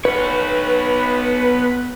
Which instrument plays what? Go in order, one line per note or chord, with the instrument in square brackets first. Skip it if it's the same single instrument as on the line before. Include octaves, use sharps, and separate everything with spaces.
[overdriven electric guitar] B3 C#5 [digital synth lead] B4